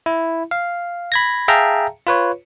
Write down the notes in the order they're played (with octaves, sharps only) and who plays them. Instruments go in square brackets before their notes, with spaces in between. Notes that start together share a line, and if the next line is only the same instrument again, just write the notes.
[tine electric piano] E4
F5
B5 G#6 A#6
G#4 E5 F5 G5 A5 A#5
F4 B4 C#5